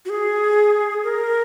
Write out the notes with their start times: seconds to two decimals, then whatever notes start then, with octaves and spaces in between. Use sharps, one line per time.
0.05 F#4
0.10 G#4
1.04 A#4